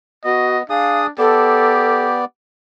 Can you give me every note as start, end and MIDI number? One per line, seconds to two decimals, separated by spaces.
0.25 0.63 59
0.25 0.56 66
0.25 0.62 75
0.70 1.11 62
0.70 1.07 68
0.70 0.99 77
0.70 1.07 87
1.18 2.25 59
1.18 2.22 67
1.18 2.05 69
1.18 2.25 74